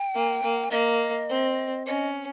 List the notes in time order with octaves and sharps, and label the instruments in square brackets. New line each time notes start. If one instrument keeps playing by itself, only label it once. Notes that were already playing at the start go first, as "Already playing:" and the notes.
Already playing: [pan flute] G5
[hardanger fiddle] A#3
A#3
[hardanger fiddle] A#3 [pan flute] D#5
[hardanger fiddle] C4
[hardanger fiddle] C#4 [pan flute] D#5